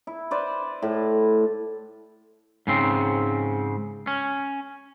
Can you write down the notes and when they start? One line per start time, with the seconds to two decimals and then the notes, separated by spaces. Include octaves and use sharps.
0.07 E4
0.31 B4 C5 D5
0.82 A2
2.67 G#2 C#3 C4
4.07 C#4